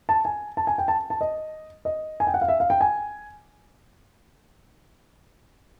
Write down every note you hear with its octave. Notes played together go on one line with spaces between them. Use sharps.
A5
G#5
A5
G#5
G5
A5
A5
D#5
D#5
G#5
G5
F#5
F5
E5
F5
G5
G#5